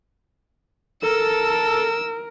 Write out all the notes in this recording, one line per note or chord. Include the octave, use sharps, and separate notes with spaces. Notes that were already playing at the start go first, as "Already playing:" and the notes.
A4 A#4 E6